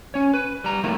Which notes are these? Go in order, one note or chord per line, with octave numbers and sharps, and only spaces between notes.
C#4 C#5
B4
G3 A#5
F2 D#3 F#3 A3 A#3 E4